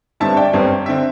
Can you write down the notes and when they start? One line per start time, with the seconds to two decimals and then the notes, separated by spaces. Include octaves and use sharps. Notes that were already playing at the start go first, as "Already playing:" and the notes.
0.20 G1 G2 D3 C4 E5 A5
0.37 D5 G5
0.53 G1 G2 D3 C4
0.86 D3 C4 E5